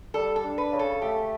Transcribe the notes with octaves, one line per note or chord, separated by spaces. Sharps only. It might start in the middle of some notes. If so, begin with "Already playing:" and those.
G3 A4
A4
D4
B4
C#3
A4
A3 G4